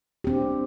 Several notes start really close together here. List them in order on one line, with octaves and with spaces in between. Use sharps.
G4 C4 D4